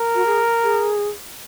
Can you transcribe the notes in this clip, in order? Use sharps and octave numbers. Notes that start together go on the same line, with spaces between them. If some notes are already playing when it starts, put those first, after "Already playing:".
Already playing: A#4
F#4
G#4
G#4